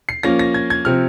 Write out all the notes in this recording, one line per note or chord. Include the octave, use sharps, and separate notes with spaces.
C7
F3 A#3 C#4 A#6
A#6
G#6
G#6
C3 F3 C4 F6